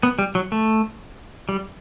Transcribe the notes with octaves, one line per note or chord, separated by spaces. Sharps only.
B3
G3
F#3
A3
G3